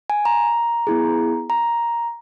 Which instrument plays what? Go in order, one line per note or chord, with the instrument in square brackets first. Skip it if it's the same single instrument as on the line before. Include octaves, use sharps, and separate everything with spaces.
[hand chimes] G#5
A#5
B3 E4 G#4
A#5